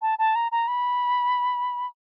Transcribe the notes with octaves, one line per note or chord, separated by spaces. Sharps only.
A5
A5
A#5
A#5
B5